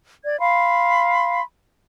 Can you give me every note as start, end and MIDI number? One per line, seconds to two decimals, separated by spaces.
0.24 0.40 74
0.24 0.40 92
0.40 1.40 77
0.40 1.40 83
0.40 1.40 84